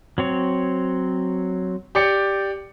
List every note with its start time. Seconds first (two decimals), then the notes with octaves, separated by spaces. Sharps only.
0.18 F#3 C4 C#5
1.95 G4 D5 C#7